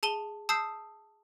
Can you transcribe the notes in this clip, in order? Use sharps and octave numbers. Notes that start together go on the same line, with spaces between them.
G#4 A5 D#7 G7
A5 D#6 E6 G6 C7